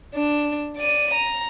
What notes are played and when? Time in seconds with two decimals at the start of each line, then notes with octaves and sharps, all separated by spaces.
0.14 D4
0.77 D5 D#7
1.14 A#5